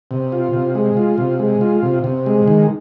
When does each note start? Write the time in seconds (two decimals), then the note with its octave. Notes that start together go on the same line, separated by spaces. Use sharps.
0.11 C3
0.32 F4
0.54 C3
0.75 G#3
0.97 F4
1.18 C3
1.39 G#3
1.61 F4
1.83 C3
2.04 C3
2.26 G#3
2.48 D#3